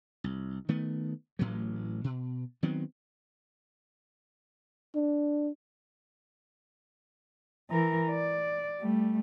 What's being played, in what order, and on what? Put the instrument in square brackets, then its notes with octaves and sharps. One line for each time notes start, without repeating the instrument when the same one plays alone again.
[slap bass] C2
D#3 A3 B3
A1 A2 E3 F#3
B2
D#3 F#3 B3 C4
[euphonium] D4
[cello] E3 A#4
D5
G3 A3